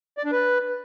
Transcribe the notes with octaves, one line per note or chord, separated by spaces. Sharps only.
D5
D4
B4